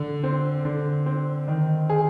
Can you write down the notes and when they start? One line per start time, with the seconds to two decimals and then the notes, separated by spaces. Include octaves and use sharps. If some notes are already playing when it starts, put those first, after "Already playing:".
Already playing: D3
0.24 C4
0.65 D3
1.06 C4
1.48 D#3
1.90 G#4